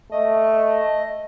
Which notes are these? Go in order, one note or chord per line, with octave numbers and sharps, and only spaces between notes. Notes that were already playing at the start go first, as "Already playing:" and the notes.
A3 D#5